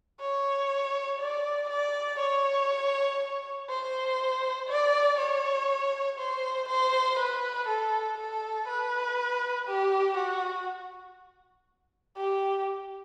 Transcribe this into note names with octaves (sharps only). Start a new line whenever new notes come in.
C#5
D5
D5
C#5
C5
D5
C#5
C5
C5
B4
A4
A4
B4
G4
F#4
G4